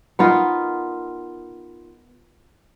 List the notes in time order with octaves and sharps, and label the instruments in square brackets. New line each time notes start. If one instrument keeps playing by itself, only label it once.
[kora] B3 D#4 F4 A#4